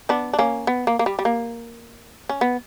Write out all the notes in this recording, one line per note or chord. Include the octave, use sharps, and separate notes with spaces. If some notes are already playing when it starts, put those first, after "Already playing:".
B3 D4
D4
A#3 C#4
B3
A#3
A#3
G3
G3
A#3
C#4
B3